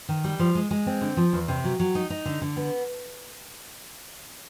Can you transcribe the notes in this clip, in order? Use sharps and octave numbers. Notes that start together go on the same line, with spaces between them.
D#3
G3
F3
G#3
G#3
C4
D3
F3
E2
C3
F#3
F#3
D#4
D#4
D3
D3
B3